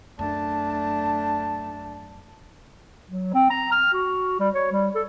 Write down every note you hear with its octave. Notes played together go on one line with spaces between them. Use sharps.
F#2 A3 D4 A5
F#3
C4
A#5
F6
F#4
G3
C#5
G3
A4